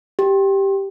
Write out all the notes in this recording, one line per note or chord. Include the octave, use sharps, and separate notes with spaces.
G4